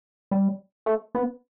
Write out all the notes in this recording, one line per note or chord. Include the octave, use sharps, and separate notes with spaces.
G3
A3
B3